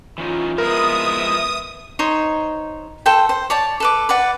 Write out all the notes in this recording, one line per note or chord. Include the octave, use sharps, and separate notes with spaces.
E3 C#4 D#4 F4
F3 G#3 B3 E4 A#4 E5 D#6
D#4 C5 C#5
A4 C5 G5
C5
C#5 D5 A5
A4 B4 D6
B4 D5 F#5